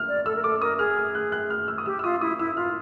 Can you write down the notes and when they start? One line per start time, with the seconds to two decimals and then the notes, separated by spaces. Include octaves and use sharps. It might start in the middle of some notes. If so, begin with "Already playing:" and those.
Already playing: F6
0.08 D5
0.26 A4 E6
0.36 A#4
0.43 A4 D6
0.61 A#4 D#6
0.79 G#4 F6
0.97 F6
1.15 F#6
1.32 F#6
1.50 F6
1.68 E6
1.78 D#6
1.86 G4 E6
1.99 E6
2.04 F4 D#6
2.21 E4 D#6
2.39 E4 E6
2.57 F4 F6